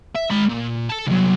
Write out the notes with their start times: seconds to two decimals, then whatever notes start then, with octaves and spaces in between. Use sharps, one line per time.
0.15 E5
0.30 G#3 B5
0.49 A#2
0.89 A4 A5
1.07 C2 F#3